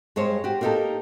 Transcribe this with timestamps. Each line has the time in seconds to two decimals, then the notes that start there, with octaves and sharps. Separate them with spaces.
0.16 G2 G#3 C5 C#5
0.44 F#4 G4
0.61 A#3 B3 D#4 G4 A4 A#4